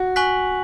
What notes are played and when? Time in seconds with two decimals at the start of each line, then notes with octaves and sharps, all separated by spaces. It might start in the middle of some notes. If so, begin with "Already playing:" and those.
Already playing: F#4
0.16 G#5 C#6 F#6 B6 F#7